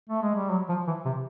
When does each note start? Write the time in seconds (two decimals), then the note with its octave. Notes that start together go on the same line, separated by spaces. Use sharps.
0.09 A3
0.22 G#3
0.36 G3
0.51 F#3
0.69 F3
0.87 E3
1.05 C3